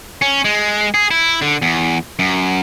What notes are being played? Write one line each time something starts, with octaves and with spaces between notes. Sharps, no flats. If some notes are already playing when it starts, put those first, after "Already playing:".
C#4
G#3
G#4
E4
D3
E2
F#2